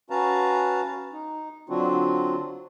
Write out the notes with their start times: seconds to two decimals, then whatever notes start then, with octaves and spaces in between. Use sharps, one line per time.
0.10 C#4 F#4 B4 F5 A5 A#5
1.13 D#4
1.69 D3 F#3 C4 D4 F4 F#4